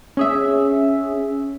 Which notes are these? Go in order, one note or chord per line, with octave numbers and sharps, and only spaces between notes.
C#4 G#4 E5